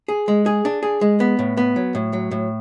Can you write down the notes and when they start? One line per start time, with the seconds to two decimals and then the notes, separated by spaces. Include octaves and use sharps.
0.08 G#4
0.28 G#3
0.46 G#4
0.65 D4
0.83 G#4
1.01 G#3
1.20 B3
1.39 A2
1.57 B3
1.76 F#3
1.95 A2
2.13 F#3
2.31 A2